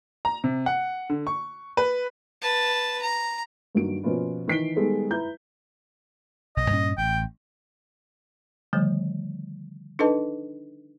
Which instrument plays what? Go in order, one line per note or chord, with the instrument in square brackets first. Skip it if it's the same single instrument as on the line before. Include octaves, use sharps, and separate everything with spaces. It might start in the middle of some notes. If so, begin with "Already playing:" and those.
[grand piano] A#5
C3
F#5
D3
C#6
B4
[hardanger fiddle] B4 A5
A#5
[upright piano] G2 D#3 F#3 A#3 D7
B2 F3 A#3 C#4 F4 B4
D#3 E3 B6 C7 D7 G7
D#3 G3 G#3 B3 G#4 A4
E4 B4 A#5 G6
[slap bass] B1 [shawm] D#5
[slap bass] G2 A#2 C#4
[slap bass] A1 [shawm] G5
[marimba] D3 D#3 F3 G3 A3
D4 D#4 A4 B4 D#5 A5